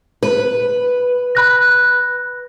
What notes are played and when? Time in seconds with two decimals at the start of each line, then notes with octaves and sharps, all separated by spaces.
0.23 B4
1.35 B5 F#6 A#6